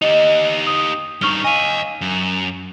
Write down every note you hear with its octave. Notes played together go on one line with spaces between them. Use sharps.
D#4 G4 D#5
D#6
G2 D#4 C#6 F6 G7
D#5 F5 G#5 D#7
F#2